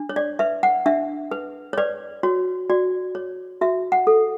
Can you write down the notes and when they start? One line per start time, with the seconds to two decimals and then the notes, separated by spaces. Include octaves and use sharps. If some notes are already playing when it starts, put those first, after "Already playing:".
Already playing: D4
0.09 C#5
0.16 D5
0.39 B4 E5
0.63 F#5
0.86 D4 E5
1.31 B4
1.73 C#5
1.78 B4 D5
2.23 F#4 C#5
2.70 F#4 D5
3.15 C#5
3.61 F#4 E5
3.92 F#5
4.07 A4